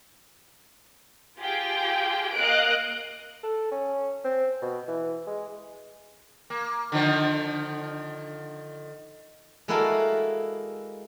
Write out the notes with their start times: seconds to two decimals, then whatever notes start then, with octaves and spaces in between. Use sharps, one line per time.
1.39 F4 G4 G#4 G5
2.33 A#3 D#5 F5 F#6 D7
3.43 A4
3.71 C#4
4.24 C4
4.62 B2
4.88 E3
5.27 G#3
6.50 A#3
6.92 D3 D#3 F3
9.68 G#3 A#3 E4 F#4 A4 A#4